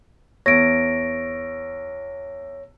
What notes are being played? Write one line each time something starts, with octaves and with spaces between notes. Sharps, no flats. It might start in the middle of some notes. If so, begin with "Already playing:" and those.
E2 C#5 A#6 D7